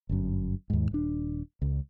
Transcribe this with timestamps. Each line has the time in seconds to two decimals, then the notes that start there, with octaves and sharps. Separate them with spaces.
0.09 G1 F#2
0.70 D#2 G#2
0.91 D#1 D4
1.62 C#2